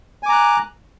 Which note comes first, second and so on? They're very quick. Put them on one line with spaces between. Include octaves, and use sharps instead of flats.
G#5 D6 A#5 F#6